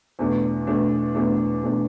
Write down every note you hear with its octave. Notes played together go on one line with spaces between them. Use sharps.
E2 B2 A3 D4
E2 B2 A3 D4
E2 B2 A3 D4
E2 B2 A3 D4